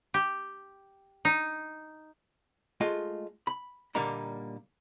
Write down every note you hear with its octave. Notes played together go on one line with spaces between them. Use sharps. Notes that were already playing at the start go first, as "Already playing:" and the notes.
G4
D#4
G#3 A3 F4 D#5
B5
A#2 D3 G3 A#3 D#4 A#5